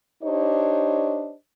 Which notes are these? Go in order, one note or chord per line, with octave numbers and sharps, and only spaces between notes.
D4 D#4 G4 C5 C#5 D#5